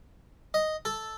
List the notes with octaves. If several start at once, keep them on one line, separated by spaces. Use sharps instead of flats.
D#5
A4